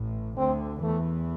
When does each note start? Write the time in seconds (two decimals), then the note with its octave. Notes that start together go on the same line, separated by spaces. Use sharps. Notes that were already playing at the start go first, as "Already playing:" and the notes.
Already playing: A1 A2
0.38 D2 D3 C4
0.83 E2 E3 A3